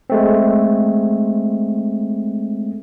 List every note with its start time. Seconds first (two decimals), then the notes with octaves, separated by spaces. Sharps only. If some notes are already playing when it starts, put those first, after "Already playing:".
0.10 G#3 A3 C4